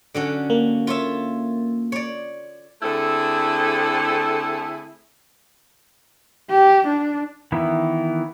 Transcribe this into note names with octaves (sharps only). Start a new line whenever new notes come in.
D3 F#3 C#4
A#3
F4 C#5 E5
C#5 D5
D3 A3 C4 E4 G#4 A4
G4
D4
D#3 E3 B3 E4